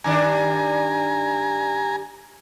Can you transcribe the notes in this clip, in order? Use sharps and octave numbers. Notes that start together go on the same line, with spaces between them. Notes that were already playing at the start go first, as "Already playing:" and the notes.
G2 D#3 D4 G#5 A#5